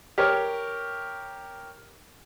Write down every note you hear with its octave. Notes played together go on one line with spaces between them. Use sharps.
G4 A#4 C#5